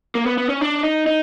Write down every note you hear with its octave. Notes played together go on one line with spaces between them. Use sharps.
A#3
B3
B3
C#4
D4
D#4
D#4